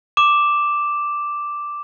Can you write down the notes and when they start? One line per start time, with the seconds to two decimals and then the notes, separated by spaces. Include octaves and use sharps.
0.17 D6 E7